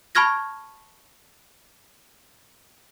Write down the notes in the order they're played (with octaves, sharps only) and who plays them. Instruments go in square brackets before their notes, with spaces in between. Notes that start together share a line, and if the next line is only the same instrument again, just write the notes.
[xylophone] A5 B5 C#6 F6 G#6 A#6